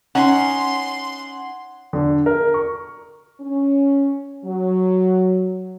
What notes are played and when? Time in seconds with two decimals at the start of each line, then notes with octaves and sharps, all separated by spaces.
0.15 C#4 D#4 F#5 C6
1.93 D3
2.26 A#4
2.54 C#6
3.41 C#4
4.45 F#3